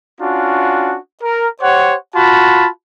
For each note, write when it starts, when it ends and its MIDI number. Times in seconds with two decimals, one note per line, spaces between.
0.20 0.96 61
0.20 0.96 62
0.20 0.96 65
0.20 0.96 66
1.22 1.47 70
1.61 1.95 67
1.61 1.95 72
1.61 1.95 73
1.61 1.95 78
2.15 2.68 65
2.15 2.68 66
2.15 2.68 81
2.15 2.68 83